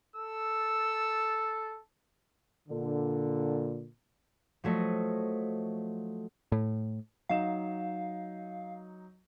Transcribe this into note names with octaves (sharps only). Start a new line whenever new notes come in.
A4 E6
A#2 D3
F3 F#3 A3 D#5
A2
F#3 D#4 F5 E7